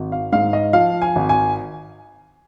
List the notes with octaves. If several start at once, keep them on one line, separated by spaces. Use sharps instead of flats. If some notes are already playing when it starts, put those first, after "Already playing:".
Already playing: G#1
F5
G#2 F5
D#5
F3 F5
G#5
G#1
G#5